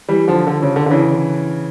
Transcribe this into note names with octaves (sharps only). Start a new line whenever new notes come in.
E3 G3
D3 F3
D3
C#3
D3
D3
C#3 E3